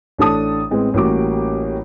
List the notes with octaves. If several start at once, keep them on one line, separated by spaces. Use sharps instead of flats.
A1 D4 A4 A5 D#6
A2 G#3 B3 C4
A1 G3 A#3 C#4 F#4 D6